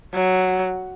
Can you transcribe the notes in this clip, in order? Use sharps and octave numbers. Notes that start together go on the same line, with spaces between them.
F#3